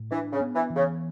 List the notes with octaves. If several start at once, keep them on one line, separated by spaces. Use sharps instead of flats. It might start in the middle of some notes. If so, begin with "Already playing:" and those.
Already playing: A2
E3 D4
C#3
B3
E3
E3
C#3